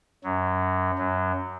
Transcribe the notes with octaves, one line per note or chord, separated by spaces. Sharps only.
F#2 F#3
F#2 F#3